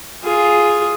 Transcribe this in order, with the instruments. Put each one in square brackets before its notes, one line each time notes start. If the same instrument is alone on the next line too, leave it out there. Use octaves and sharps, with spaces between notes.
[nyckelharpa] F4 G#4